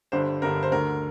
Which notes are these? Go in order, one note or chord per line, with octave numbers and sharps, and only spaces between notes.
G1 G2 D3 C5
G1 G2 D3 A#4
C5
D2 D3 A#4